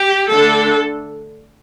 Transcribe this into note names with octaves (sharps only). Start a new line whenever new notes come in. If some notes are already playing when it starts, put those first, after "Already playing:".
Already playing: G4
D3 A3 D4 A4